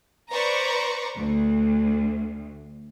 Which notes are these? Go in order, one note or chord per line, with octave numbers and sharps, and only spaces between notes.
B4 C5 D5 A#5 C#6
D2